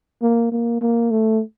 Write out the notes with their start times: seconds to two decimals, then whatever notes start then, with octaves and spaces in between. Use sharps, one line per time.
0.22 A#3
0.52 A#3
0.81 A#3
1.11 A3